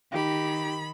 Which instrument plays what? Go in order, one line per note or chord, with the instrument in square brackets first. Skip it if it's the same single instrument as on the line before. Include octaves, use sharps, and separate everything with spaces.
[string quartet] D#3 B5 [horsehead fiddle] D#4 G4